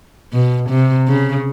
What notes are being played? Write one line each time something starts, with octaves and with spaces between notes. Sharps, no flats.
B2
C3
C#3